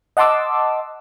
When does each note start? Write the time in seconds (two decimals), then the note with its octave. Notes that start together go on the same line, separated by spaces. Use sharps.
0.17 D#5 F#5 A5 C6 D6 E6